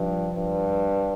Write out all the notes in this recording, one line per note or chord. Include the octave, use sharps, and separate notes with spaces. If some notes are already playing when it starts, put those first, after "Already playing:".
Already playing: G2 F3
G2